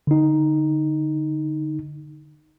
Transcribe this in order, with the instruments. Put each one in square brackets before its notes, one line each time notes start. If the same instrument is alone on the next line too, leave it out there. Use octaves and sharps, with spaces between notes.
[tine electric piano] D3 D#4